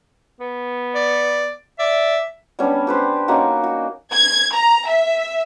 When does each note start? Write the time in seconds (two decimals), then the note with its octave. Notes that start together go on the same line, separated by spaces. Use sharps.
0.40 B3
0.96 D5
1.79 D5 E5
2.59 G3 B3 C#4 D4
2.87 G4 B4 C5
3.28 A#3 C#4 D#4 F#4
3.64 F#4
4.13 G#6
4.54 A#5
4.88 E5